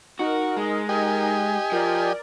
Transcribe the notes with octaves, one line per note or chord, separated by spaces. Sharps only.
D#4 F#4 A#4
G#3
G4 D#5 G#5
F3 A#4 D5